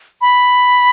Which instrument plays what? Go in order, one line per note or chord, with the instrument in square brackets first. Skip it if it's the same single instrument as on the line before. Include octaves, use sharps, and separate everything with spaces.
[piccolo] B5